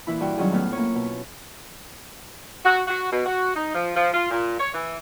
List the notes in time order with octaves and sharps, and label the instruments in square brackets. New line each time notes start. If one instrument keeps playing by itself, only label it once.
[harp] A#2 E3 E4 B5
G2 F#4 G5
D#3 F#3 G3 C#4 F4 G#4
A2 B3 F6
A#3 C#4 C#5
B2
[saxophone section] F#4
F#4
B2
F#4
D#4
F3
F3
F4
A#2
C#5
E3